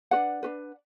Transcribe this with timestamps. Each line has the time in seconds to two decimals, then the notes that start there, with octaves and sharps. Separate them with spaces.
0.11 F#4 B4 D5 F#5
0.16 D4
0.43 D4 F#4 B4